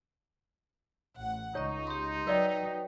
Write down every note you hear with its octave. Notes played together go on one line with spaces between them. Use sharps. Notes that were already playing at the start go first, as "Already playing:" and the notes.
A1 F#5
C#2 D#4 C#5 D#5 C#6
G4 C6
F#3 A#4 B4 D5 D#5 G5